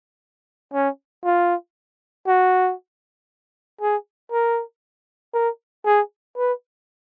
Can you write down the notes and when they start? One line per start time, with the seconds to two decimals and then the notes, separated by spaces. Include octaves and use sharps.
0.74 C#4
1.24 F4
2.27 F#4
3.81 G#4
4.32 A#4
5.34 A#4
5.86 G#4
6.37 B4